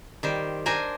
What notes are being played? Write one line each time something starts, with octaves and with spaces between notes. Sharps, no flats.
D#3 G3 C5
D4 A#4 C5 G#5 A#5